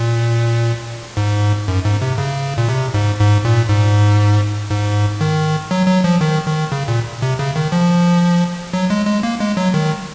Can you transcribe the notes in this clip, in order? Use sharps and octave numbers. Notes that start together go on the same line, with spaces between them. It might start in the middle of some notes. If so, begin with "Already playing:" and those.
Already playing: A#2
G#2
F#2
G#2
C3
C#3
A#2
C3
G#2
G#2
A#2
G#2
G#2
D#3
F#3
F#3
F3
D#3
D#3
C#3
A#2
C3
C#3
D#3
F3
F#3
G#3
G#3
A#3
G#3
F#3
D#3